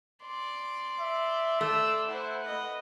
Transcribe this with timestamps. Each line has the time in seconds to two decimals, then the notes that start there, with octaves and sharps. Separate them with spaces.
0.24 D5 C6
1.00 E5
1.61 A3 E6
2.07 E4 C5 F#5
2.42 B4 D#5